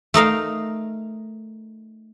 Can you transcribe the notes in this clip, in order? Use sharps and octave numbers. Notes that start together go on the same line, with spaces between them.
A3 D#4 A#4 F5